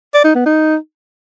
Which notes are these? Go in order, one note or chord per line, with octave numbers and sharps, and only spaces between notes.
D5
D#4
B3
D#4